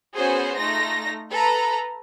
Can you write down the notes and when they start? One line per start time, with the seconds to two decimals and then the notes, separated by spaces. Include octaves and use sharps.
0.14 B3 C#4 F#4 G#4 C5
0.57 A3 D#4 F4 A#6
1.31 A4 B4 A#5